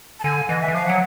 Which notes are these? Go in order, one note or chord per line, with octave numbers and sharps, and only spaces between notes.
A5
D3 G#5
E3 D#5
E5
E3
F3 F5
F#3 F#5